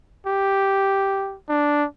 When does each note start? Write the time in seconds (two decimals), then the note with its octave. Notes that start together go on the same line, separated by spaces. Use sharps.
0.26 G4
1.49 D4